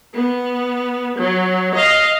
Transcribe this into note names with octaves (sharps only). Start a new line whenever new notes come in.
B3
F#3
D#5 F5